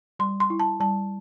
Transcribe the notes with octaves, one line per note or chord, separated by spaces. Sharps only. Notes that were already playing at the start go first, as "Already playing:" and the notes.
G3 C6
C6
E4
A5
G3 A5